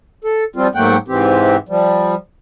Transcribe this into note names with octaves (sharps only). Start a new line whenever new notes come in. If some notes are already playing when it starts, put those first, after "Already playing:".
A4
F3 G3 C4 F4
G#2 F#3 A3 A#3 F#5 G5
G#2 C3 E3 C4 G4
F3 G3